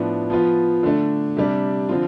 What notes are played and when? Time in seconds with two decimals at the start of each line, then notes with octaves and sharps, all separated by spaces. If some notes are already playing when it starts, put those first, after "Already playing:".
Already playing: A2 F3 B3 D4
0.30 F3 B3 F4
0.83 D3 A3 D4
1.37 C3 G3 D4
1.89 D3 F3 C4 F4